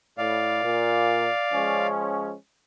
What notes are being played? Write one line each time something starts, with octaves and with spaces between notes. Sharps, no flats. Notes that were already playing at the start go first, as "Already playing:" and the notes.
A2 D5 F5
A#2
F3 G#3 C#4